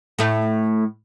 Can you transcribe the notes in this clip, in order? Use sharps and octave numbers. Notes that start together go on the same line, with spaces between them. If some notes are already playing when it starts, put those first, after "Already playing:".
A2 A3